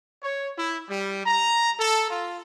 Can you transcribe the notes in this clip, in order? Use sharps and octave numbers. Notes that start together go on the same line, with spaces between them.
C#5
E4
G3
A#5
A4
F4